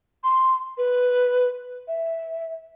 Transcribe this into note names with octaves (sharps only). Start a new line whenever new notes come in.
C6
B4
E5